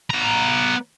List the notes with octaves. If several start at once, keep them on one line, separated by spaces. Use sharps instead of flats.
B3 A#5